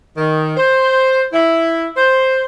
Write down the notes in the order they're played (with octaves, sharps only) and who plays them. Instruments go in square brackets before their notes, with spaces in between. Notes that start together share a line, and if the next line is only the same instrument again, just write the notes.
[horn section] D#3
C5
E4
C5